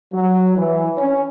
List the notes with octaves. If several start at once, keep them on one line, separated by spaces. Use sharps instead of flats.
F#3
E3
C#4